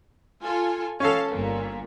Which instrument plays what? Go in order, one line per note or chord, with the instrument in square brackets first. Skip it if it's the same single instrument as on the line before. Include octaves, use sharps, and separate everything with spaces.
[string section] F4 A4 G#5
[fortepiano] C#4 A4 [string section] F5 A5
[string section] G1 A#2